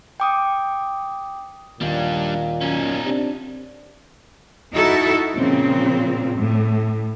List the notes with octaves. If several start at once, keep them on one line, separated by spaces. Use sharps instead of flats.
G5 D6 D#6
D#2 A#2 G3 D4
F#2 C#4 D#4
C3 D4
D#4 E4 F#4 A4
A#2 C#3 F3 C4
A2